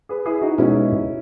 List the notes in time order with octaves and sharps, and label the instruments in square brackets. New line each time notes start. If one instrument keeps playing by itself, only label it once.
[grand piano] G#4 B4
E4 G#4
D#4 F#4
[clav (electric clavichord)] B2 G#3 D#4 [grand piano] C#4 E4